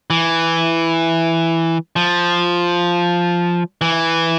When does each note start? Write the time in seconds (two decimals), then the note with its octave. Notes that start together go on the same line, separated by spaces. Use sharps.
0.10 E3
1.96 F3
3.81 E3